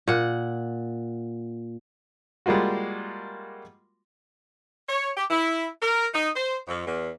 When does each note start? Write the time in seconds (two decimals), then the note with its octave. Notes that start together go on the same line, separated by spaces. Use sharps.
0.08 A#2 F#5
2.46 G3 G#3 A#3 F4 F#4
4.89 C#5
5.17 G4
5.30 E4
5.82 A#4
6.14 D#4
6.36 C5
6.68 F2
6.87 E2